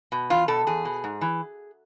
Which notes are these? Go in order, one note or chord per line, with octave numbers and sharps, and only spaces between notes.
B2
E2 F4
B2 A4
E2 G#4
B2
G#2
E3